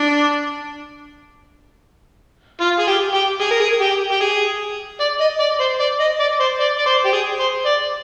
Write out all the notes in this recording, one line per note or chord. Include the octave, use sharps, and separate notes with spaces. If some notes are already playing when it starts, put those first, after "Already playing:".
Already playing: D4
F4
G#4
G4
G4
G#4
A#4
G#4
G4
G4
G#4
D5
D#5
D5
C5
D5
D#5
D5
C5
D5
D5
C5
G4
G#4
C5
D5